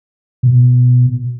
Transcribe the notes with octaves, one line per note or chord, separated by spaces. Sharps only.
B2